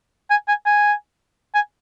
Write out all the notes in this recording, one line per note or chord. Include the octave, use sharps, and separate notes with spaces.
G#5
G#5
G#5
G#5